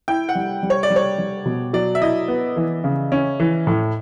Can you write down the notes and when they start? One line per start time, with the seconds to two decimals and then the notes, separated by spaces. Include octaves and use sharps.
0.08 E4 G5
0.29 F#5
0.35 G3
0.63 G3
0.70 C#5
0.83 D5
0.90 G3
0.96 C#5
1.18 G3
1.46 B2
1.73 F#3 D5
1.95 E5
2.01 E4 D#5
2.28 B3
2.56 E3
2.84 C#3
3.12 C#4
3.40 E3
3.67 A2